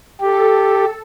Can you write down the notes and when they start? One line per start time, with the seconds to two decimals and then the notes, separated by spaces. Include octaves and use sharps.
0.21 G4 A4